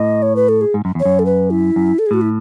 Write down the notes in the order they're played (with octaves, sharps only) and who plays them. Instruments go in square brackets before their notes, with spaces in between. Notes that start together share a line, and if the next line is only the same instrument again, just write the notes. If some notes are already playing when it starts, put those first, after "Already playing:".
Already playing: [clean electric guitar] A2 [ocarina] D#5
[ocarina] C#5
B4
A4
G#4
[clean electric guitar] G#2
F#2
[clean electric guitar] E2 [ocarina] C#5
[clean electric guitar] F#2
[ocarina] A4
B4
E4
[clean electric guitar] F#2
[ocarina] A4
G#4
[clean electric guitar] A2 [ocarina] F#4
[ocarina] E4